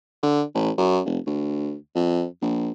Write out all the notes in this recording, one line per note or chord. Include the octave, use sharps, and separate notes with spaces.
D3
A1
F#2
F1
D2
F2
A#1